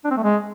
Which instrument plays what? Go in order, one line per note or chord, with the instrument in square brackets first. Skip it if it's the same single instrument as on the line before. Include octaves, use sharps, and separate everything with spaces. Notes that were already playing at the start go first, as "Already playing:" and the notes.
[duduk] D4
C4
A3
G#3